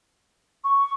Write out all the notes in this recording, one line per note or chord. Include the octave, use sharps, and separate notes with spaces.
C#6